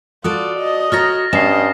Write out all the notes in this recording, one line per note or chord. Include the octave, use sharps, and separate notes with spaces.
F4 F#4 A4 D5 D#6
D#5
F#4 C#5 A#5 F6 A6 A#6
G2 C#4 D#5 C7 E7